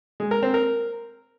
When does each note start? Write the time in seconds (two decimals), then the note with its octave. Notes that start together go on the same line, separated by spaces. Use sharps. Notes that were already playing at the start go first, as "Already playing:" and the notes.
0.20 G#3
0.31 A#4
0.43 C4
0.54 A#4